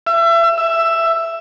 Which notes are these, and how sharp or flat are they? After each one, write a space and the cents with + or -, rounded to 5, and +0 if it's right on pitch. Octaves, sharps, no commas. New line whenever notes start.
E5 +30
E5 +10